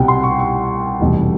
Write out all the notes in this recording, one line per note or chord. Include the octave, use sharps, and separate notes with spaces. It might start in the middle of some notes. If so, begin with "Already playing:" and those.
Already playing: C2 B2 G3 C4 F#5 G5
C6
C#6
C#6
F1 E2 B2 G3